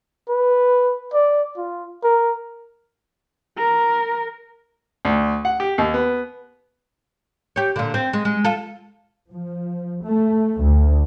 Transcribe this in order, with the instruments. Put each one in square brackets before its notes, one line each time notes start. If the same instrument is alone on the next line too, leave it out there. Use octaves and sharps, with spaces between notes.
[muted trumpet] B4
D5
F4
A#4
[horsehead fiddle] A#4
[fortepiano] D2
F#5
G4
D#2
B3
[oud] G4 C#5
A#2 D3
C4
G#3
G#3
F4 A4
[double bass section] F3
A3
D2